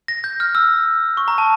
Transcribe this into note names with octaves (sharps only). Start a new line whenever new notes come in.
A#6
G6
F6
E6
C#6
A#5
A5